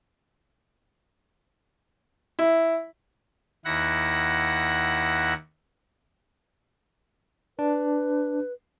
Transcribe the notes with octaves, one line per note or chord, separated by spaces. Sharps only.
E4
D#2 E4 F#5 A#6
D4 B4